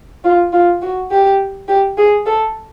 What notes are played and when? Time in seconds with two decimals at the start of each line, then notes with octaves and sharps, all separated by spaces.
0.24 F4
0.53 F4
0.82 F#4
1.11 G4
1.68 G4
1.97 G#4
2.26 A4